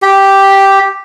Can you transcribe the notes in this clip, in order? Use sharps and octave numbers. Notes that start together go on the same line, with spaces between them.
G4